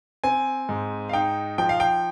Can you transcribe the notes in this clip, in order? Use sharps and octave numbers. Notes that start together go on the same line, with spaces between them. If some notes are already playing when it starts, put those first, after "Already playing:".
C4 G#5
G#2
F5
D#4 G5
F3 G5
F5
G5